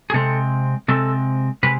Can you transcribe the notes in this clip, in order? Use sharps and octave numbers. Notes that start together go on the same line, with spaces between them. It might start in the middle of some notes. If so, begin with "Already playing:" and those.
G#4
C3 G#3 C4 A4
C3 G#3 C4 A4
C3 G#3 B4